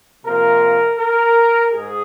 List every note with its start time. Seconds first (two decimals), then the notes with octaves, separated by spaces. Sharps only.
0.25 C3 F3 A#3 A#4
0.99 A#4
1.73 G#2 G#4